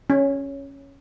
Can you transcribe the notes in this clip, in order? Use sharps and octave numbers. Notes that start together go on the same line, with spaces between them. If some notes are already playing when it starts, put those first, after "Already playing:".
C#4